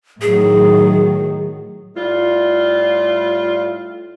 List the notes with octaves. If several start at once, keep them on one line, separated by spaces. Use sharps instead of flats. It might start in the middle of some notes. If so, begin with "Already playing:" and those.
A2 D#3 F#3 G#4
A2 G3 F4